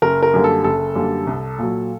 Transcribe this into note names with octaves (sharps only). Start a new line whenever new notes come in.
F#1 A#4
A#4
F#2 D3 G3 A#3
A4
F#1 A4
F#2 D3 G3 A#3
C2
A#2 F#3